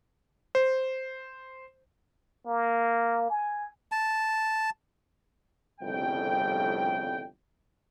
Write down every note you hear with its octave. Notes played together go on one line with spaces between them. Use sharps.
C5
A#3
G#5
A5
G1 C2 F2 A2 C#3 G5